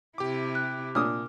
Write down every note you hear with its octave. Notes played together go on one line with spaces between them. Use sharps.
C3 E4 G4 D6
F#6
A#2 D4 D6 D#6 F6